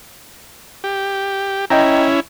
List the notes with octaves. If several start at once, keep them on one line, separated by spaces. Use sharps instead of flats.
G4
C#4 E4 D#5 G5 A#5